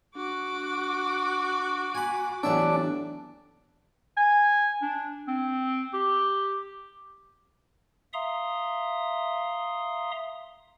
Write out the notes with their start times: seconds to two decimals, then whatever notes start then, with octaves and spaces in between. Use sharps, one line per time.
0.15 D4 F#4 D6
1.95 G#5 B5
2.43 A1 F#3 B3 D4 E5
4.17 G#5
4.82 D4
5.28 C4
5.94 G4
8.13 E5 F5 A#5 C6 D#6